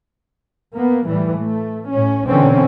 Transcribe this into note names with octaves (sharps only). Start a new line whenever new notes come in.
A#3 B3
A2 E3 G3
A3
A2 C#4
B2 D3 E3 C4 C#4